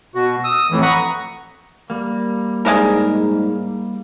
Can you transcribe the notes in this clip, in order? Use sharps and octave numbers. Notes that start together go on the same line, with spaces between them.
B2 F#4
D#6 E6
F2 A2 E3
F#5 A#5 B5 C#6 D#6
G3 A#3
G#2 G#3 D4 A#4